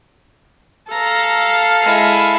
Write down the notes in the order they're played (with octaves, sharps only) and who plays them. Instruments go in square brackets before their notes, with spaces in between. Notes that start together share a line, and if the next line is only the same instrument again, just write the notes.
[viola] A4 F5 [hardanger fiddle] A#5
[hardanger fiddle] G#3 E4